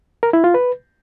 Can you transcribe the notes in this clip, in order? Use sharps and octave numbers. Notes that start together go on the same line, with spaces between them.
A#4
E4
F4
B4